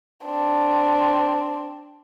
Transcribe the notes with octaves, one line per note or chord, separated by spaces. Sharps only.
C4 D4